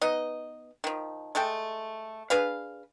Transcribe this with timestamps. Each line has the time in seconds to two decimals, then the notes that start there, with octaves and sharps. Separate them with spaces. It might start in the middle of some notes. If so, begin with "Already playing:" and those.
0.01 B3 D#4 D#5
0.84 D#3 F3
1.35 G#3 A3 A4 G5
2.30 D4 G#4 B4 F5